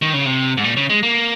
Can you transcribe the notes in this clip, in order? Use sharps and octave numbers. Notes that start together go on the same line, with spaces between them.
D#3
C#3
C3
G#2
A#2
C#3
G#3
A#3